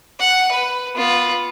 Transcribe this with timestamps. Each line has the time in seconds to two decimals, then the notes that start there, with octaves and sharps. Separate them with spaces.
0.20 F#5
0.51 B4
0.96 B3 F4